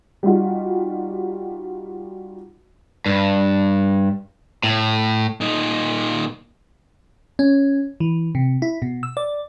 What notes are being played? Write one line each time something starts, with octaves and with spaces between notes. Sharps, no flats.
G3 D#4 F4 F#4
G2
A2
A#2 D#4
C#4
E3
C3
E4
B2
E6
D5